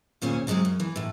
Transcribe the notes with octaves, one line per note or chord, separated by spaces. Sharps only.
D#2 A#2 C#4 G#4 C5
C#3 F#3 G#3 B3 C4
F#2
E3
E2 A2